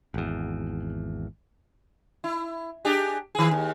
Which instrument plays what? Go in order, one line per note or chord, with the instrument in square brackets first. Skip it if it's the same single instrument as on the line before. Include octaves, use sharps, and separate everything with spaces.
[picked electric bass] G#1 E2
[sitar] E4
D4 G4 G#4
D#3 G#4
D#2